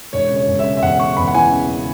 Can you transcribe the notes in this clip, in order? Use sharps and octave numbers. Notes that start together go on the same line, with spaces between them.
E1 C#5
C#3
C#5
E1
E5
C#3
E5
E2 F#5
C#3 C#6
E2 B5
F#5
E3 G#5
C#3
C#3